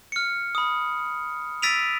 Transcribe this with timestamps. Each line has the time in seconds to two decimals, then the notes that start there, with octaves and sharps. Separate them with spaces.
0.12 F6 C#7
0.55 B5 D#6
1.62 E6 A6 B6 D7 D#7 F7